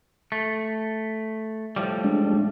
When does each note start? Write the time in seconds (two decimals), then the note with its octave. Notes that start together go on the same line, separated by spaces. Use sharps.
0.32 A3
1.76 A2 F3 G3
2.04 G#3 D4